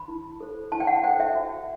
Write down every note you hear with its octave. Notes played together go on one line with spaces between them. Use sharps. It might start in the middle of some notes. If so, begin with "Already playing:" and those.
Already playing: B5
E4
A4 C5
E4 A5
G5
F#5
A4 C5 G5
E5
F#4